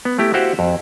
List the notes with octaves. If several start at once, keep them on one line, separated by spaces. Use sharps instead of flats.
B3
A3 E4 G4
E4 F#4 G4 C5 F5 F#5
F2